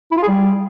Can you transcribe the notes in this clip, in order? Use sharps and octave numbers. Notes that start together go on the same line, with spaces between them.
E4
F4
G#4
G3